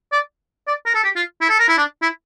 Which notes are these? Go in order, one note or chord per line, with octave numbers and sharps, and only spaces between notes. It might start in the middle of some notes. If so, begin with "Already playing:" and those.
D5
D5
A#4
A4
G4
F4
E4
A4
A#4
E4
D4
E4